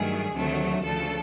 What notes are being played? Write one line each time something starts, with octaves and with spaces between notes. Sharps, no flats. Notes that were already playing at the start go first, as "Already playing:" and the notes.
Already playing: G2 D#3 F#3 A3 G#4
D2 C3 D#3 F#3 A3
D2 C#3 F3 A4